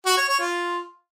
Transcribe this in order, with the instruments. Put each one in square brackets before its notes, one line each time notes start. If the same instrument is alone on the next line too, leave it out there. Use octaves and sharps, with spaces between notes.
[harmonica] F#4
C#5
C#5
F4